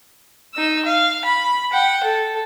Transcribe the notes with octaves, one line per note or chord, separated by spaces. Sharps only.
D#4 E6
F5
B5
F#5 G5
A4